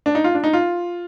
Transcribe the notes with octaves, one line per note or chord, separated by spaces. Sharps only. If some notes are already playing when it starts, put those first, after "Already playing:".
D4
D#4
F4
D4
D#4
F4